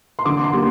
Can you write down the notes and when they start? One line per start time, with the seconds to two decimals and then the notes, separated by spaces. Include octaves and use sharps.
0.19 C6
0.26 D3 D6
0.44 C6
0.53 G3 A#3